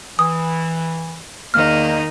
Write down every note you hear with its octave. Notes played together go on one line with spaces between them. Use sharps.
E3 D#6
E2 D#3 A#3 D#4 F6